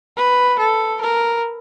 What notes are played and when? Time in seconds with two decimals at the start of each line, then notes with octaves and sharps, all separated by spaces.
0.17 B4
0.59 A4
1.01 A#4